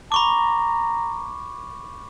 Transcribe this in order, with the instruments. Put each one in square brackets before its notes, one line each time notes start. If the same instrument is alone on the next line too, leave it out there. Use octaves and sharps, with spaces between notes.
[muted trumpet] A#5 [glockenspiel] B5 C#6 D6